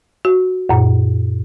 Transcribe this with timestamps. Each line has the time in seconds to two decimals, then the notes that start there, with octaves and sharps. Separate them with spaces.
0.25 F#4
0.69 F#2 A#2